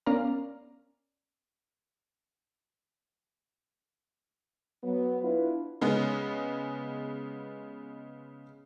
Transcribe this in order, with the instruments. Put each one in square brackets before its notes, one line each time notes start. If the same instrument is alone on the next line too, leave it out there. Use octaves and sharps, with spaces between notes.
[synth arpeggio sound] B3 C#4 A#4 D5 F5 A#5
[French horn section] F#3 B3
B3 D4 E4 F4 B4
[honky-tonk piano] C#3 G#3 B3